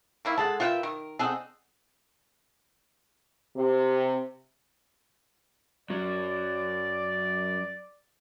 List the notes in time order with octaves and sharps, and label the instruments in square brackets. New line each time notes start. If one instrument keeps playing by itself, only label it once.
[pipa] D#3 A#3 E4
[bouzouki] G#3 A4 F#5 [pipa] A5
[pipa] F4 F#5 G5 [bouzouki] A#4 B4 E5
[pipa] D#3 [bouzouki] A#4
[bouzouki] C4 D4 D#4 [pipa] G#4 A4 F#5
[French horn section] C3
[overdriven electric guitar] F#2 F#3 [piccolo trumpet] D5